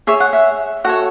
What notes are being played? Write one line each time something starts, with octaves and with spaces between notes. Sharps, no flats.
G#4 C#5 E5
F#5
E5
F#4 A4 C#5 F#5